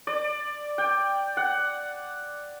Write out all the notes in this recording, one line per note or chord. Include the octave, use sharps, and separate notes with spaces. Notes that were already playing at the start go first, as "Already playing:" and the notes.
D5
G5
F#5